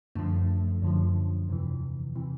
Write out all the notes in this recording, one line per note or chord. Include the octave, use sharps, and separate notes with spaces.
F#2 D3 F3 A3
F#2 D3 F3
E2 C3 E3
C3 E3